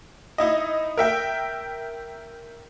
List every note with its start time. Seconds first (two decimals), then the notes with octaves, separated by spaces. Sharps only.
0.38 D#4 E4 D#5
0.97 A#4 E5 G5